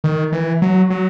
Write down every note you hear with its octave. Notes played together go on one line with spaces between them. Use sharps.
D#3
E3
F#3
F#3